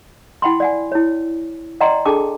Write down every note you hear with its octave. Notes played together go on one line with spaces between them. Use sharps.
E4 F#5 G5 B5 C6
D5 F#5 G#5
E4 C#5
D5 D#5 F#5 G5 A#5 C6
D4 G#4 A4 G5 A5 D6